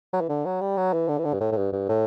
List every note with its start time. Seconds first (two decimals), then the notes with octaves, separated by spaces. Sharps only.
0.13 F#3
0.21 E3
0.29 D3
0.45 F#3
0.61 G3
0.77 F#3
0.93 E3
1.08 D3
1.18 E3
1.24 D3
1.33 G2
1.40 A2
1.52 A2
1.57 G2
1.72 G2
1.89 A2